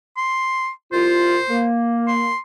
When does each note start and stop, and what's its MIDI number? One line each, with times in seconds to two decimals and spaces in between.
0.17 0.70 84
0.93 1.38 36
0.93 1.38 65
0.93 1.66 72
1.49 2.31 58
2.08 2.38 84